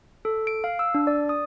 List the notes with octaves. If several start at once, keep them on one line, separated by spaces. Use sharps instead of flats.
A4
D7
F5
E6
D4
D5
D#6